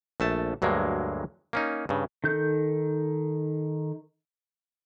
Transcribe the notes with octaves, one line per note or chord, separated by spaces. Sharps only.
A#1 A3 A5
D2 G2 F#3 G#3 A#3
A#3 C#4 D#4
G2 C#3
D#3 A4 G6